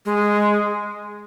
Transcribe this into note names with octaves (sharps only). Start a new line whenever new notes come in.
G#3